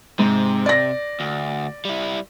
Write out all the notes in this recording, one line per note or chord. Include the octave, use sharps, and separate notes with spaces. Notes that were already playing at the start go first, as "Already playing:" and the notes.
G#2 C3
D5 A#6
D2
G3 E4